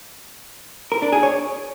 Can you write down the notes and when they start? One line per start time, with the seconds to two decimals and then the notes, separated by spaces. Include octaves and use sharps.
0.92 A#4
1.02 D4
1.12 G#4
1.23 C#5